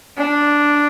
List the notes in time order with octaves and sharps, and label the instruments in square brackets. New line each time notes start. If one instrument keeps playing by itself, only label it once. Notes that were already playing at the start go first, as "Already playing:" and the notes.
[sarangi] D4